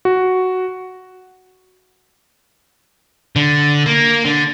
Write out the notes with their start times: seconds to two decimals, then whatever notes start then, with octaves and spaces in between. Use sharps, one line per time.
0.05 F#4
3.36 D3
3.86 A#3
4.25 D3